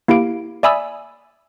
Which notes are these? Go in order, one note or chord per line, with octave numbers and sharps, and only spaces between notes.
A#3 E4 G4 F5 D7
D5 E5 G#5 B5 D#6 E6